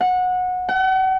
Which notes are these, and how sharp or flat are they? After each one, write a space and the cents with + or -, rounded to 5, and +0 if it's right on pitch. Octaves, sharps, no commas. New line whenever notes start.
F#5 -20
F#5 +40